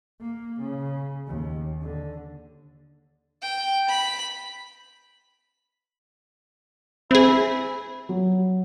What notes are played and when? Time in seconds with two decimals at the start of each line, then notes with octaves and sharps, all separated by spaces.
0.20 A#3
0.61 C#3
1.27 D#2
1.82 D3
3.42 G5
3.89 B5
7.11 C4 E4 G#4
8.09 F#3